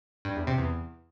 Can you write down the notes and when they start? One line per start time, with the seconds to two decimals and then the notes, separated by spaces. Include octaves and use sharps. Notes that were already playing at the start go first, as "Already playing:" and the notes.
0.25 G2
0.36 E2
0.47 C3
0.58 E2